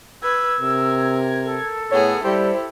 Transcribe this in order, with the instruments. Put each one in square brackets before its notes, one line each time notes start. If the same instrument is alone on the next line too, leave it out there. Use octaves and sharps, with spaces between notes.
[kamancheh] B4 [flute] E6 [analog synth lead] G#6
[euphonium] C3 [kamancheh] A#4
[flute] A4
[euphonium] A2 [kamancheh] B3 G#4 [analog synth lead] C#5
[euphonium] G3 [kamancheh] E4 G4 [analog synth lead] C5